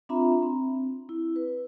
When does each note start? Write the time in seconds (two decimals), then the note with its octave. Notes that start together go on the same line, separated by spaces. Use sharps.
0.09 C4 D4 F4 E5 A#5 B5
0.43 C4
1.09 E4
1.36 B4